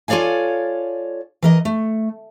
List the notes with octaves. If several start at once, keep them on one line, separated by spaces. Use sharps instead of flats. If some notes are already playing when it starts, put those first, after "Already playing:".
F4 A4 C#5 D5 F5 G#5
E3 A#4 D#5
A3